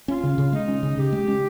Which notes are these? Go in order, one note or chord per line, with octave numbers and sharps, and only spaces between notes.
C#4 F4
C#3
C#3
G#3 D#4
C#4
C#3
C#3 G4
G#3
C#4